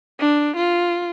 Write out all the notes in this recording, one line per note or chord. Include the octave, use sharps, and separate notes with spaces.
D4
F4